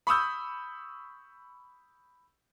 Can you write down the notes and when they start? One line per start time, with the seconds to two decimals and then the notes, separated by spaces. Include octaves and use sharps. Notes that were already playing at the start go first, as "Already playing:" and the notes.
0.07 B5 C#6 D#6 E6 G6